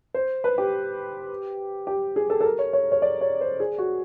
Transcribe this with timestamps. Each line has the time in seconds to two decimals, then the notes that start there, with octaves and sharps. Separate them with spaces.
0.14 C5
0.44 B4
0.58 G4
1.87 G4
2.16 G#4
2.30 A4
2.41 A4
2.45 A#4
2.59 C#5
2.73 C#5
2.92 C#5
3.02 D5
3.21 C#5
3.41 C5
3.60 G#4
3.78 F#4